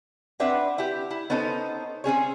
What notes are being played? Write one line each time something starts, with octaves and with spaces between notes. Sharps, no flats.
C4 D4 B4 E5 F#5
E4 G4
E4
B3 C#4 D#4 A4 C5
C4 C#4 G#4 C#5